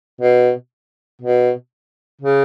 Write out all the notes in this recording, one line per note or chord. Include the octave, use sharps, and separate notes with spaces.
B2
B2
C#3